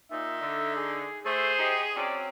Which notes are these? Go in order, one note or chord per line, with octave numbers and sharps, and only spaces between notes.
A#2 D#4 E5
D3
G#4
A3 G#4 C5
D#4 G4
F#3 C4 C#4 D5